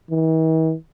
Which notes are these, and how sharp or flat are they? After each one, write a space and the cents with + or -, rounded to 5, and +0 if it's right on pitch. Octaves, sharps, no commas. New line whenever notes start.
E3 -45